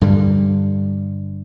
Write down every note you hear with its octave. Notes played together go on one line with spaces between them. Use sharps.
G2 D3 G3